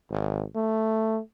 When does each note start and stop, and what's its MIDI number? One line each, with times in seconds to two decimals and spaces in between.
0.11 0.43 32
0.55 1.19 57